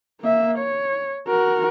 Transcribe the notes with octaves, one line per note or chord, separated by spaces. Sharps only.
A#3 E5
C#5
F#4 A#4